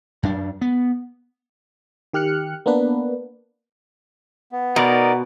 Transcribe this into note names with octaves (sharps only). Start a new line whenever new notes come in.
F#2 D4
B3
D#3 G4 F6 F#6 C#7
A#3 B3 D4 B4
B3
B2 D#4 A#4 D5